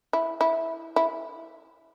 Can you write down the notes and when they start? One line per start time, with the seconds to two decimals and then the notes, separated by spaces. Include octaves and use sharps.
0.13 E4
0.41 E4
0.96 E4